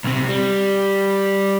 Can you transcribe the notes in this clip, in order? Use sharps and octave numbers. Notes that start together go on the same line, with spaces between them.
B1 C3
G3